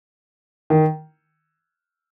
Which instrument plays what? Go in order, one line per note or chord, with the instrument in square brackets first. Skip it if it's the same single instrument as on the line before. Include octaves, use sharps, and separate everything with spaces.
[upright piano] D#3